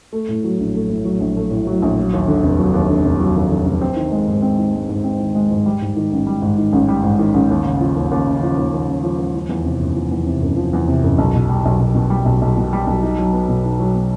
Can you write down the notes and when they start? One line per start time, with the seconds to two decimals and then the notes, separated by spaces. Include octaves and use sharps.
0.13 A3
0.28 A2
0.44 F#3
0.59 A#1
0.74 A3
0.89 A2
1.05 F#3
1.20 A#1
1.36 A3
1.51 A2
1.67 F#3
1.82 A#1
1.97 F#3
2.13 D#2
2.28 D3
2.43 F1
2.59 F#3
2.74 D#2
2.90 D3
3.04 F1
3.20 F#3
3.36 D#2
3.51 D3
3.66 F1
3.81 C4
3.96 D#3
4.12 G#3
4.27 G#2
4.42 C4
4.58 D#3
4.74 G#3
4.89 G#2
5.04 C4
5.20 D#3
5.35 G#3
5.50 G#2
5.66 G3
5.82 G#2
5.96 D#3
6.12 A1
6.27 G3
6.42 G#2
6.58 D#3
6.73 A1
6.88 G3
7.03 G#2
7.19 D#3
7.34 A1
7.50 D#2
7.65 C#3
7.80 F3
7.96 D#2
8.11 D#2
8.27 C#3
8.42 F3
8.57 D#2
8.73 D#2
8.88 C#3
9.03 F3
9.18 D#2
9.35 F3
9.49 E2
9.65 C3
9.80 F#1
9.95 F3
10.11 E2
10.26 C3
10.42 F#1
10.57 F3
10.73 E2
10.88 C3
11.03 F#1
11.18 B1
11.34 B2
11.49 G3
11.65 B1
11.80 B1
11.95 B2
12.10 G3
12.25 B1
12.41 B1
12.57 B2
12.73 G3
12.87 B1
13.02 D#4
13.19 F#3
13.33 B3
13.48 B2
13.65 D#4
13.80 F#3
13.95 B3